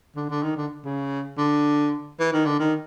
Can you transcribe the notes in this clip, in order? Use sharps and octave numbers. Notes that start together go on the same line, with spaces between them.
D3
D3
D#3
D3
C#3
D3
E3
D#3
D3
D#3